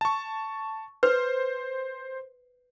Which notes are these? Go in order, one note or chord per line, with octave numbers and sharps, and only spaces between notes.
A5 C#6
B4 C5